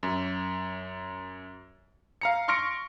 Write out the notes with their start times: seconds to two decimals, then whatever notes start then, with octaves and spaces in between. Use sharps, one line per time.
0.03 F#2
2.21 F5 A#5 C#7
2.48 C6 C#6 F6 A#6 C#7 D7